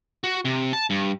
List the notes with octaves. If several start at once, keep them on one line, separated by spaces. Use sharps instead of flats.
F#4
C3
A5
G2